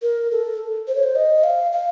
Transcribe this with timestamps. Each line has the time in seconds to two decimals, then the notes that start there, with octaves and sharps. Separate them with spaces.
0.02 A#4
0.31 A4
0.88 C5
0.95 C#5
1.03 C5
1.16 D#5
1.44 F5
1.72 F5